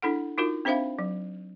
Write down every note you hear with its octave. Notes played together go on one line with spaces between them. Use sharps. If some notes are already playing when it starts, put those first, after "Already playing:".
D4 E4 A4 F#5
D#4 F4 F#4 A#4
C4 D4 C5 E5 F5 B5
F#3